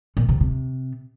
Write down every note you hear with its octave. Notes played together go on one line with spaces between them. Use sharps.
A#2
C3
C3